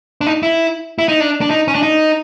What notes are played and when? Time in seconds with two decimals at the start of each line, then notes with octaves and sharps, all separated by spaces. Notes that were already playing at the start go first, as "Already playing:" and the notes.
0.21 D4
0.27 D#4
0.43 E4
0.98 E4
1.08 D#4
1.20 D4
1.41 D4
1.50 D#4
1.68 C#4
1.75 D4
1.83 D#4